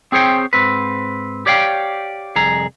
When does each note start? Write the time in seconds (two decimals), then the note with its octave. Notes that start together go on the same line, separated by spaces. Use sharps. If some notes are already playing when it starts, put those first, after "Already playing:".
0.12 C4 G#4 C5 C#5 G5
0.53 G#2 C4 B4
1.46 G4 C#5 D5 F5 G5
2.36 C2 F2 G#4 A#5